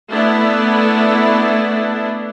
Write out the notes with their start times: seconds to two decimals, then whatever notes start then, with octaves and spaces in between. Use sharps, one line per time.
0.11 A3 B3 D4 E4